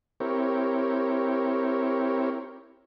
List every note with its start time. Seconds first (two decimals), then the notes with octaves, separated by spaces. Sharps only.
0.20 C4 E4 G4 A#4 C#5